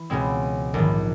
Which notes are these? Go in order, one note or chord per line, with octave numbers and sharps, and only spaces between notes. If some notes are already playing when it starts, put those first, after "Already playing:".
Already playing: E3
C#2 B2 G#3 C4
A#1 G#2 D#3